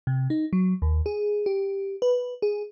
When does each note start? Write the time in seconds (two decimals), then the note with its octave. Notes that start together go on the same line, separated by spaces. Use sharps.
0.07 C3
0.30 D#4
0.53 F#3
0.82 D#2
1.06 G#4
1.46 G4
2.02 B4
2.42 G#4